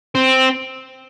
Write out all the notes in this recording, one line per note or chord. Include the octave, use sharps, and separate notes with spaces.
C4